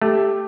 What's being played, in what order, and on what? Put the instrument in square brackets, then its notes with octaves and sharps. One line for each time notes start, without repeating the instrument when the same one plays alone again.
[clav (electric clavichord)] A3 [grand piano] G4